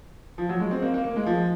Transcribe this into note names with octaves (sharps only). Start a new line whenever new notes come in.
F3
F#3
G#3
C4
A#3
A#3
A#3
G#3
F3